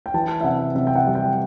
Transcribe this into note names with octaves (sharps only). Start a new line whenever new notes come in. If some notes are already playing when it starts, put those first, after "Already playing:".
G5
E3 A5
E5
C3 F#5
C3 E5
G5
F#5
G3
G5